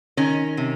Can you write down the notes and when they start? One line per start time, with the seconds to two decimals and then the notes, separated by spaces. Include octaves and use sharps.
0.17 D#3 C#4
0.57 C3